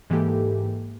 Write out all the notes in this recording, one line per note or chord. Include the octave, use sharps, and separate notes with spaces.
G#2 E3 A#3 G4 A4